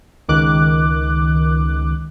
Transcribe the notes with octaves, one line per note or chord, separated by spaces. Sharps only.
C#2 D#3 D6 F#6